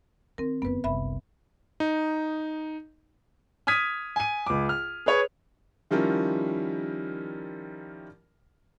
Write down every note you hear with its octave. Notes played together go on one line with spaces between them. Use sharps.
D#3 C4 A#4
F#1 D#2 B3 B4
F#1 C2 E5 B5
D#4
D#6 F6 G#6 B6 D#7
G#5 D#7
C#2 D6
F6
G#4 B4 C#5
D#3 F3 G3 C#4 E4 A#4